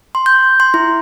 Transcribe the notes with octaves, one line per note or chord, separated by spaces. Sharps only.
C6
G6
C6
E4